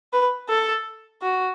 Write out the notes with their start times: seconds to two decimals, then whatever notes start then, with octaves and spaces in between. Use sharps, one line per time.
0.13 B4
0.49 A4
1.22 F#4